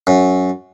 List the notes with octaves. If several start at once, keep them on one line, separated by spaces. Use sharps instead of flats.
F#2